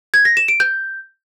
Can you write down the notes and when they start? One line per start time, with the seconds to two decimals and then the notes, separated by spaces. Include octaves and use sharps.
0.14 G#6
0.25 A#6
0.37 E7
0.48 D7
0.60 G6